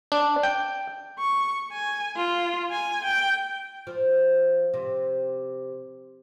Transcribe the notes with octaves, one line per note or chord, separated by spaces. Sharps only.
D4
G5
C#6
G#5
F4
G#5
G5
F3
C3